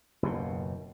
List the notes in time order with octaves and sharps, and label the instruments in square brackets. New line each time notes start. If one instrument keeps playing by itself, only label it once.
[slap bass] F#1 D#2 B2